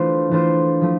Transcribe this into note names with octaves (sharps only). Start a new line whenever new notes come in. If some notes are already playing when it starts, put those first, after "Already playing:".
Already playing: E3 A3 D4 F4 C5
E3 A3 D4 F4 C5
F3 A3